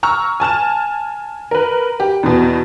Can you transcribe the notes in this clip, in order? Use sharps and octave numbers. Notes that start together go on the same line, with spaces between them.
A#5 C#6 E6 F6
G#5 A5 F6 E7
A#4 B4
G4
E2 B2